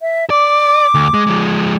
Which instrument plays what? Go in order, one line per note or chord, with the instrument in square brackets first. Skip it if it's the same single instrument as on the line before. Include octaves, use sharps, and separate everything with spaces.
[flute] E5
[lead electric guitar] D5 [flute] D6
[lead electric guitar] D2
G#3
F3 G#3